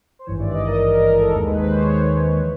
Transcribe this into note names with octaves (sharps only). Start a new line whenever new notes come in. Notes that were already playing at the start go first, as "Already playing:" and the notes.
C5
G#1 G2 E3 C#5
D5
D#5
A#4
A#4
A#4
A#4
A4
D#2 D#3 G#3 A#4
B4
C5
C#5
E3